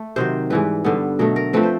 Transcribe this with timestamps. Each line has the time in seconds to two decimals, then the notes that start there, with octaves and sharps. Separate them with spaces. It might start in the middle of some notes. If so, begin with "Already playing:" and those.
Already playing: A3
0.16 C3 D#3 F#3 C5
0.50 G#2 E3 G3 B4
0.84 G2 D3 G3 B3
1.19 B2 F#3 A3 A#4
1.36 A#4
1.53 F3 A3 C4 B4
1.63 C5